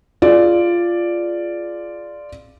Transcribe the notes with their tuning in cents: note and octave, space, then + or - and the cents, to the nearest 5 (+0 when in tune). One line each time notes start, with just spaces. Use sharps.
F4 -10 G#4 +25 D5 +0